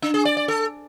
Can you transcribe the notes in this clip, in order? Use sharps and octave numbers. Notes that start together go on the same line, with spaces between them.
D4
G#4
D5
D5
A4